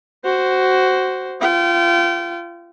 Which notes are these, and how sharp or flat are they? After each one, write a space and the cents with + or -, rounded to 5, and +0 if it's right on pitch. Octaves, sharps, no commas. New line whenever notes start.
F#4 +15 C5 +0
F4 -30 G5 -30